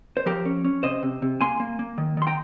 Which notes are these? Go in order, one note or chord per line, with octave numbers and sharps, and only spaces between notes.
C5
F3 G4 A#4
C#4
C#4
C3 C5 D#5
C3
C3
A#3 G#5 C6
A#3
A#3
D#3
D#3 C6
G5 A#5